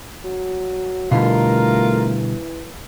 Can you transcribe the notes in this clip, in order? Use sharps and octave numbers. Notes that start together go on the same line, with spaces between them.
F#3
B2 D3 E3 G3 A3 F4 A#4